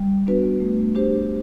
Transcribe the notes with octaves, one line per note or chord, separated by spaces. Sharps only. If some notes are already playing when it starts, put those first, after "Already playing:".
Already playing: G3
B3 D4 F#4 B4
A3
D4 G4 C5